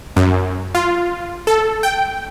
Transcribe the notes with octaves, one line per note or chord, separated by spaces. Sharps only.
F#2
F4
A4
G5